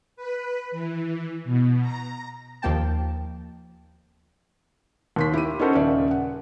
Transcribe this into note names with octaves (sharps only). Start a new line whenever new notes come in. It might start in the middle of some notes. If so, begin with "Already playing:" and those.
B4
E3
B2
A#5
D#2 F3 A#3 G5 A5
D#2 C6 B6
E4 G4 D#7
C#4 D#4 F#4 A4 A#4 C5
D#1 C#3 D5 E5
F#5